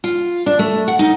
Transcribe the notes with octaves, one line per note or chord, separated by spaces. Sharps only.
F4
D4
A3
F#5
D#4